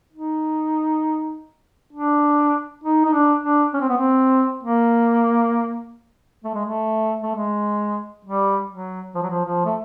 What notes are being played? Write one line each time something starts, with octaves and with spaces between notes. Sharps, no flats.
D#4
D4
D#4
D#4
D4
D4
C#4
C4
B3
C4
A#3
A3
G#3
A3
A3
G#3
G3
F#3
F3
F#3
F3
F3
A3